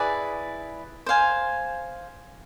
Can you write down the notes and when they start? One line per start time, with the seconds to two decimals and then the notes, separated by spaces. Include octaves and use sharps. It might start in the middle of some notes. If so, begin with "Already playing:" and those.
Already playing: E4 G#4 B4 D5
1.06 C5 F5 G#5